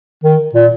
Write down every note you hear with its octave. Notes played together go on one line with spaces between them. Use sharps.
D#3
A#2